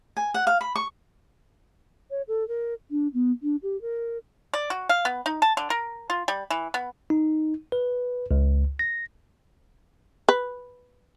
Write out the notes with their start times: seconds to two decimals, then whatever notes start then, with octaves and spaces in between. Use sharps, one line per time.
0.17 G#5
0.34 F#5
0.47 F5
0.61 B5
0.76 C#6
2.10 C#5
2.28 A4
2.48 A#4
2.91 D4
3.14 B3
3.43 D4
3.63 G4
3.81 A#4
4.54 D5
4.70 F#4
4.89 F5
5.05 B3
5.26 D#4
5.42 A5
5.57 D3
5.70 A#4
6.10 F4
6.28 G3
6.50 E3
6.74 B3
7.10 D#4
7.72 B4
8.31 C#2
8.79 A#6
10.29 B4